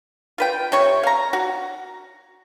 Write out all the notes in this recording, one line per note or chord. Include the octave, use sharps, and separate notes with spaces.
F4 B4 G5
C3 C#5 C#6
F5 A#5
F#4